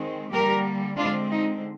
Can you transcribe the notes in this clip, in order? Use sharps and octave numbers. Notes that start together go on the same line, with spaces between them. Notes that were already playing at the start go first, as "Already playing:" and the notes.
Already playing: D#3 G#3 C4
D3 G3 A#3 G4 A#4
D3 G#3 C4 D4 F4
D#4